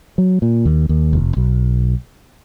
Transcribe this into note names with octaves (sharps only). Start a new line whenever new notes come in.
F#3
A#2
D#2
D#2
F1
B1